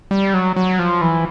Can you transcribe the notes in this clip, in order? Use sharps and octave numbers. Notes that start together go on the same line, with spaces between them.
G3
F#3
F#3
F3
E3